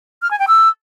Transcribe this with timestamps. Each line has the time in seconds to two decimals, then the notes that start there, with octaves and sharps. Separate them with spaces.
0.22 F6
0.30 G#5
0.39 G5
0.47 E6